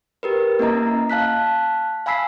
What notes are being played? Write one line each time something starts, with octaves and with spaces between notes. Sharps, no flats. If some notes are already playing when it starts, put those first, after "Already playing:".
G4 A#4 B4
A#3 C#4 E4 D#5 A#5
F5 A5 F#6 B6
F5 G#5 B5 E6 B6 C7